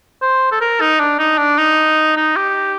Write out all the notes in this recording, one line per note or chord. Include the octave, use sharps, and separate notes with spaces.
C5
A4
A#4
D#4
D4
D#4
D4
D#4
D#4
G4